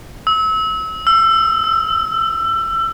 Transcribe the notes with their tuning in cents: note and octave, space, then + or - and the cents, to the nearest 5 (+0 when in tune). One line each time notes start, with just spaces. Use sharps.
E6 -30
E6 +25
E6 +30